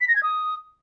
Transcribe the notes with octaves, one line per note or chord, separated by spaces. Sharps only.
B6
A#6
G#6
D#6